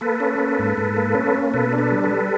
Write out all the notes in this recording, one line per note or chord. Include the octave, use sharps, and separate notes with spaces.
A#3 A4 B4
C#4
A#3
G#2
G#2
A#3
C#4
A#3
B2 A4 B4
D4
A4 B4
G3
A4 B4
G3